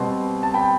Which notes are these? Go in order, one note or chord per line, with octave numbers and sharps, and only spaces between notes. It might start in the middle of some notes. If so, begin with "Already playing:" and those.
Already playing: B2 G3 C4 C6
A5
G5 B5